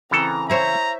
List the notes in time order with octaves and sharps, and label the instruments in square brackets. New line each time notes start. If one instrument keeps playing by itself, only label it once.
[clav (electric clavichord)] C#3 E3 A4 [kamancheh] C4 A#5
[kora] E4 C5 C#5 [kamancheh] E5 [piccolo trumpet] A#5